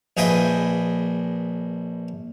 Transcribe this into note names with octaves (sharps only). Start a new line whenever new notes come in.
A#1 G#4 B4 D#5 E5 G5